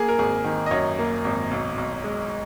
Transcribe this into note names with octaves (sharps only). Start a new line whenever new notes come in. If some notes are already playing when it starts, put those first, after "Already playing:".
Already playing: A#3 G#4
A#4
G#1 G#4
D#3
D#5
F#2 C#5
A#3
G#1
B1
B1
G#3